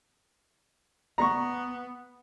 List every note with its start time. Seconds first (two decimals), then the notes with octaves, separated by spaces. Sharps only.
1.18 B3 A#5 C#6